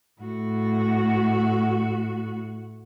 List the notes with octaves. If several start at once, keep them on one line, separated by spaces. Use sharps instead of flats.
A2 F#4